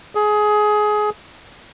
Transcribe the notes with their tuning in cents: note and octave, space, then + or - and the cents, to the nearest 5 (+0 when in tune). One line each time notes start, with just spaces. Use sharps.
G#4 +20